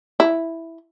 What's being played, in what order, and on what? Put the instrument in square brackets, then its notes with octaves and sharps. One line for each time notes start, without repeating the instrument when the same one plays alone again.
[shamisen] E4